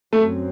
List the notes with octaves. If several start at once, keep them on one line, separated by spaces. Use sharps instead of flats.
F#2 F#3 A3 C4